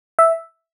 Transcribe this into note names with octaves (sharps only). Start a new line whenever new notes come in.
E5